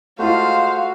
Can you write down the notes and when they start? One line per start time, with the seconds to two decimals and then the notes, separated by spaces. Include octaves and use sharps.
0.19 G#3 A3 F4 F#4 C5 F5